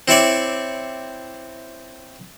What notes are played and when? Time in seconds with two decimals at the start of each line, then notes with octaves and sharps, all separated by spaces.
0.08 C4 E4 C#5 D5